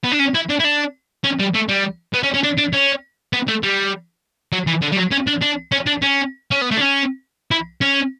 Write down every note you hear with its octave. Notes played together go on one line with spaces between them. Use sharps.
B3
D4
C#4
E4
D4
E4
D4
C#4
G3
A3
G3
B3
C#4
C#4
D4
D4
C#4
B3
A3
G3
F#3
E3
D3
G3
F#3
C#4
D4
D4
C#4
D4
C#4
C#4
B3
A3
D4
C#4
E4
C#4